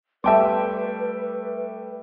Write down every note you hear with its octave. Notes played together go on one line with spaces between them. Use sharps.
G3 A3 B4 E5 G5 A5 C6 D6